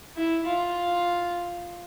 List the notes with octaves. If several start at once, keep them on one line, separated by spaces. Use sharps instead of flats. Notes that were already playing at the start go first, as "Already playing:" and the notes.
E4
F4